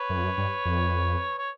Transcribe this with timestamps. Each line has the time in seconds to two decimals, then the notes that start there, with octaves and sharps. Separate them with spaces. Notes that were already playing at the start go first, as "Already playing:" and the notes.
Already playing: B4 C#5
0.10 F#2
0.17 F2
0.24 F#2
0.38 G2
0.65 F2
1.38 C#5